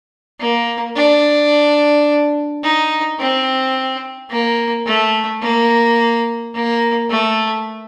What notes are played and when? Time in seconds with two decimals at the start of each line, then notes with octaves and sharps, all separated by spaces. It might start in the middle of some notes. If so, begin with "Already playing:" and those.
0.39 A#3
0.96 D4
2.63 D#4
3.19 C4
4.30 A#3
4.86 A3
5.42 A#3
6.54 A#3
7.09 A3